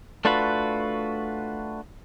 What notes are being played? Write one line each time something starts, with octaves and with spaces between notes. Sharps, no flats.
A3 D4 F4 F#4 B4